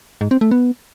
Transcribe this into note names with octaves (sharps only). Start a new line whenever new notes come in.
G#2
C4
A3
B3